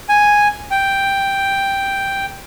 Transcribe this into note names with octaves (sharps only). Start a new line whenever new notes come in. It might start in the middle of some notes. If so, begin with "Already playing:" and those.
G#5
G5